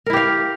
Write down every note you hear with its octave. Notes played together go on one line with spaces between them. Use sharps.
E4 G4 A#4 F5